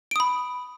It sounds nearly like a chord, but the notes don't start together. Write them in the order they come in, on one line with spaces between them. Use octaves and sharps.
D7 D#6 B5